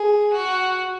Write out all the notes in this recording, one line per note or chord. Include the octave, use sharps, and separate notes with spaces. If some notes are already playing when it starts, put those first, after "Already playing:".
Already playing: G#4
F#4